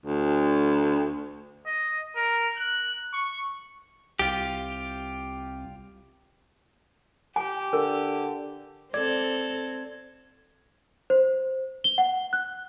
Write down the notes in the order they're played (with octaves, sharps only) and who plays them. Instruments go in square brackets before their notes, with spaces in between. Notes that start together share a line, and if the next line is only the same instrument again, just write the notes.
[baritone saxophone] D2
[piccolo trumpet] D#5
A#4
F#6
C#6
[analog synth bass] C2 [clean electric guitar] F4 G4
[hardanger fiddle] G4 [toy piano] G#5
[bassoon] D3 [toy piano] A#4
[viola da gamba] C4 A4 [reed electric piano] D5 [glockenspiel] G#6
[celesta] C5
G7
F#5
F#6